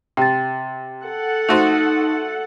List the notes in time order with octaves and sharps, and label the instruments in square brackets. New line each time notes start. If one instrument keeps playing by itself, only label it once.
[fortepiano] C3 [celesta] G5 A6
[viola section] A4 F#5
[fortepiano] A3 F#4 C5 [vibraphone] D#4